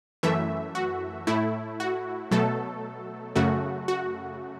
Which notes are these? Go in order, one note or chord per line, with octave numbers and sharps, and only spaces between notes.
F#2 E3 A3 E5
F#4
A2 A3 E4
F#4
B2 F#3 A3 A4
F#2 C#3 A3 F#4
F#4